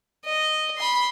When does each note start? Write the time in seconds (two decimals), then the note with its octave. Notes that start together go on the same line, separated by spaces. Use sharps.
0.24 D#5
0.78 B5 C6